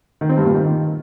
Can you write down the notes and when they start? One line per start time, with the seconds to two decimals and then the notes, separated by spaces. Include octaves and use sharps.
0.21 D#3
0.29 C4
0.38 G2
0.46 A#2
0.54 D#3